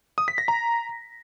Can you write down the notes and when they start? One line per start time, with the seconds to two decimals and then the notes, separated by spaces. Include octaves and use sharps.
0.18 D#6
0.28 B6
0.38 A#6
0.48 A#5